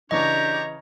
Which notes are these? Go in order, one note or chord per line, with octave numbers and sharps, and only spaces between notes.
C#3 E3 D4 G4 C#5 D#5 A#5 C#6